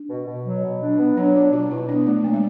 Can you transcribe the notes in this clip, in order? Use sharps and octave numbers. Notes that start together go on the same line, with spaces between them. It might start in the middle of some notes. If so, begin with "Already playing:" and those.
Already playing: D4
B2
B2
F#3
B2
D4
B3
F#3 D4
D4 F4
B2 F4
B2 E4
B3 D4
A3 D4
F#3 A#3
G#3